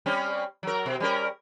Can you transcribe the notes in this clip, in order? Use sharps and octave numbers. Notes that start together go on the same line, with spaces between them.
G3 C4 C#4
F#3 A#4
B2
G3 C#4 A#4